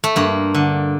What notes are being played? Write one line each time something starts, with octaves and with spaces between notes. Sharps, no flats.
A3
G2 A#3
D3